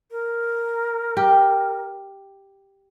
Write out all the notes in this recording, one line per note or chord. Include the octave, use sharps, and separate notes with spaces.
A#4
G4